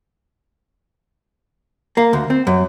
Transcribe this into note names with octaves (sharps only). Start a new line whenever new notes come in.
A#3
D2
C4
F#2